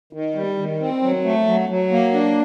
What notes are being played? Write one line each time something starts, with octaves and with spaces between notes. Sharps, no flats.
D#3
G3
D#3
C4
F#3
A3
F#3
F#3
A#3
D4